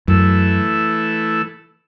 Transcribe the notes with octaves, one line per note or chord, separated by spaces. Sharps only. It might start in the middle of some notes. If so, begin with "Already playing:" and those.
F#2 E3 A3 E4 A4